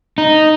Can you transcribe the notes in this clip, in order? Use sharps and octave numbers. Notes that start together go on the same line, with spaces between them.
D#4